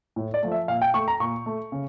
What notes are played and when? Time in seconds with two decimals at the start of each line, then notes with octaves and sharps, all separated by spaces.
0.16 A2
0.34 D5
0.42 F3 A3
0.52 E5
0.68 A#2 F5
0.82 G5
0.94 A3 C#6
1.08 A#5
1.20 A#2 C#6
1.46 A3
1.72 C#3